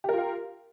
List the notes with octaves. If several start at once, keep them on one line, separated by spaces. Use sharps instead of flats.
F4 G4 A#4 F5